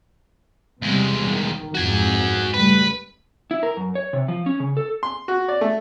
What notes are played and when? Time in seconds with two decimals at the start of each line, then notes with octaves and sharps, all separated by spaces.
0.82 E2 C3 G3 G#3
1.28 D#3
1.75 F2 G#2 F#4 G#5
2.54 C#3 G3 A3 B4
3.51 E4
3.63 A#4
3.77 F#2
3.95 C#5
4.13 C3
4.28 F3
4.46 C#4
4.60 C#3
4.77 A4
5.03 C6
5.28 F#4
5.48 D5
5.61 A3